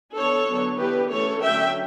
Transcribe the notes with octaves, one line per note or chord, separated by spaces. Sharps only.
E3 B3 D4 A4 C#5
D3 F#3 B3 D4
E3 B3 D4 G4 B4
E3 A3 C#4 A4 C#5
D3 F#3 A3 C#4 E5 G5